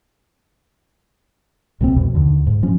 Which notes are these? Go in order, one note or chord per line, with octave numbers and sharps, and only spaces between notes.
C2 C3 A3 C4
F2 B2
D#2 D3
G#2
G2 F3 C#4